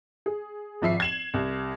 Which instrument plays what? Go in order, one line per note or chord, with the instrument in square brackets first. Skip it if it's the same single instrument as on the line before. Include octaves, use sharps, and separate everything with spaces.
[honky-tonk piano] G#4
G#1 F3 E5 C7
G#6 E7 F#7
C2